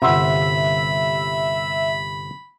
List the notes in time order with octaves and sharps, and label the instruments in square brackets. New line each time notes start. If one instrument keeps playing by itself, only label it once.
[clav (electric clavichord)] G1 C3 [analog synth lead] E5 [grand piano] F#5 C6 E6 [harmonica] B5